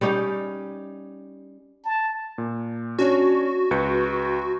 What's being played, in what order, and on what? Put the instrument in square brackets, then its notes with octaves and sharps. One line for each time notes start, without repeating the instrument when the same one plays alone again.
[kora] G3 C#4 D#4 G4
[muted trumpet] A5
[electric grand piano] A#2
[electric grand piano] C#4 D4 C#5 [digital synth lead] F#4
[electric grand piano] C#2 B4 C#7